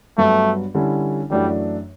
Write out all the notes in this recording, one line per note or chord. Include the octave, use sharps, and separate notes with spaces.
G2 F#3 A3 B3 F#4
D3 G3 C#4 E4
F#2 E3 G3 A3 D4 F#4